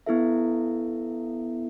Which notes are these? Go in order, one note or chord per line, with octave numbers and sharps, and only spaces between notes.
B3 E4 A4 E5